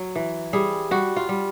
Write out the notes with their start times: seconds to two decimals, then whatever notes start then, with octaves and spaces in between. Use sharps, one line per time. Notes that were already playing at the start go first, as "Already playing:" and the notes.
Already playing: F#3
0.16 E3
0.53 G3 G#4
0.91 G3 F#4
1.17 F4
1.29 G3